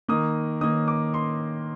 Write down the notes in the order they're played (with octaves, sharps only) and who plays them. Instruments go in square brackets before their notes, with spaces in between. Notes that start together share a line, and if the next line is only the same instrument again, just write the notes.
[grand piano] D#3 A#3 D#6
D#3 A#3 D#6
D6
C6